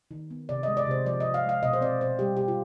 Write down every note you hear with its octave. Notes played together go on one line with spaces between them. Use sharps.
D#3
B3
C3 D5
D#5
G#3
D5
C3 C5
F3 D5
D#5
C3
F5
G#3
F5
B2 D#5
C5
C4 D5
B2 C5
G3 G4
B2 G4
F4